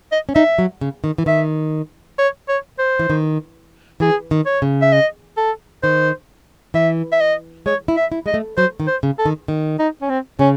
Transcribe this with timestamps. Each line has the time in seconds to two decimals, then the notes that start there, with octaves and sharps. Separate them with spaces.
0.12 D#5
0.29 C#4
0.35 D#4 E5
0.58 F#3
0.81 C#3
1.04 D#3
1.18 E3
1.26 D#3 E5
2.19 C#5
2.48 C#5
2.78 C5
2.99 E3
3.10 D#3
4.00 E3 G#4
4.31 D#3
4.46 C#5
4.62 C#3
4.81 E5
4.92 D#5
5.37 A4
5.83 D#3 C5
6.74 E3 E5
7.12 E5
7.20 D#5
7.66 G#3 C#5
7.88 E4
7.96 E5
8.12 E4
8.26 G#3 D#5
8.34 A3
8.57 F#3 C5
8.80 D#3
8.87 C5
9.03 C#3
9.18 A4
9.25 D#3
9.48 D#3
9.79 D#4
10.01 C#4
10.09 C4
10.39 C#3 C#4